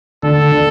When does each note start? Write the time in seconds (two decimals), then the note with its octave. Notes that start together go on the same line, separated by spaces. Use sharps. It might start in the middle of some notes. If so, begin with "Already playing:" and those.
0.23 D3 A4
0.52 D3